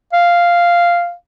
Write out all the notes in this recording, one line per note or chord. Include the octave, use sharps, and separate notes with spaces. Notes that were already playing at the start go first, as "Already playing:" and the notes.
F5